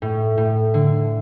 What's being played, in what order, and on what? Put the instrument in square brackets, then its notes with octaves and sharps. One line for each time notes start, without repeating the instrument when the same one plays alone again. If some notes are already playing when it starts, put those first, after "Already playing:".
[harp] A2
A2
D3